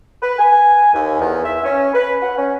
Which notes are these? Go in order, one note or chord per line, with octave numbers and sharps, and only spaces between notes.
B4
G#5
D#2
E2
E5
C#4
B4
F#5
C#4